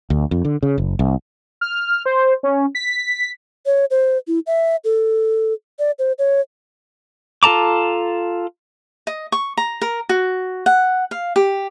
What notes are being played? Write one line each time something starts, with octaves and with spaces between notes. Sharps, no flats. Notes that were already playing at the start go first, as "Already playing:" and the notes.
D2
F2
D3
C#3
F#1
C2
F6
C5
C#4
B6
C#5
C5
E4
E5
A4
D5
C5
C#5
F4 A4 A5 A#5 D6
D#5
C#6
A#5
A#4
F#4
F#5
F5
G4